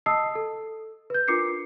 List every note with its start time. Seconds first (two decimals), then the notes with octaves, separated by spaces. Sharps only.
0.06 D#5 A5 D#6 E6 C7
0.35 A4
1.10 B4 G6
1.28 D4 F4 A#4 D6 C7 C#7